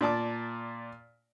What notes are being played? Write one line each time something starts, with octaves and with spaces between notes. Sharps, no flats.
A#2 D5 A5 D6